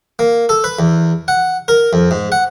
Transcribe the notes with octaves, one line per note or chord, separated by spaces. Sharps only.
A#3
A4
B4
E2
F#5
A#4
F2
G#2
F#5